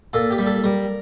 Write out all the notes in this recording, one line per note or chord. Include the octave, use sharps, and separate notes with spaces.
A#2 A4
G4
G3
A4
G3 A#4